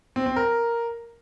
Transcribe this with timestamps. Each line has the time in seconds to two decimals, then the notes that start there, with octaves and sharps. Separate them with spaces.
0.16 C4
0.26 C4
0.36 A#4